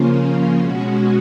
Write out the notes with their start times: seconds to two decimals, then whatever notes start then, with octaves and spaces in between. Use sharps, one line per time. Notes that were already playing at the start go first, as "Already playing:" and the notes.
Already playing: C#3 F3 A#3 C#4 F4
0.58 B2 G#3 C#4 F#4